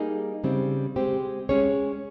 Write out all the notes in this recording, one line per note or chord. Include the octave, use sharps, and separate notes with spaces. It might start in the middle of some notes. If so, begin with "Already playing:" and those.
Already playing: G3 A#3 D#4 G#4
C#3 G3 C4
G#3 C4 G4 C5
G#3 C#4 G#4 C#5